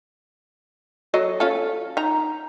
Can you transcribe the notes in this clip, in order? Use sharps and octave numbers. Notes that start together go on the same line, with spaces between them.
F#3 A4 D#5
C#4 F4 A4
D#4 A#5